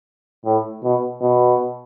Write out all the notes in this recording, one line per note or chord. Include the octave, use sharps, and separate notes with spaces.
A2
B2
B2